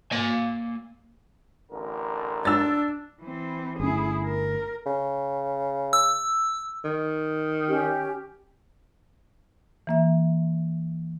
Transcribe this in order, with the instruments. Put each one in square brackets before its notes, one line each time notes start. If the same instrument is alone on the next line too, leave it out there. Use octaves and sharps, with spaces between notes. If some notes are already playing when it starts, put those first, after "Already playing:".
[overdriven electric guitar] A#3 G#5
[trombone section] A1 D3 A#4
[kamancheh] D4 [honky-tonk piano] E6 A6
[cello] E3 C4
[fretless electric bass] G1 A3 C#4 [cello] E4 G#4
[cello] A#4
[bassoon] C#3
[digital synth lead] E6
[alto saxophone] D#3
[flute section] C#4 G4
[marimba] E3 A#3 E5